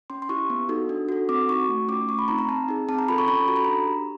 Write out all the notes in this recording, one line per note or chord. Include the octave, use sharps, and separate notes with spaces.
C#4 C6
C6
E4 G4 C#6
B3
D#4 F#4 A4
D4
F#4 A4
C4 D6
D#4 F#4 C#6
A3
C#4 F4 D6
A3 C#6
B5
C4 D#4 A#5
A#5
C4 A5
D#4 G#4
C4 A5
A#5
F4 A4 B5
C#6
C#4 B5
F#4 A4 A#5
B5
D4 A#5
G4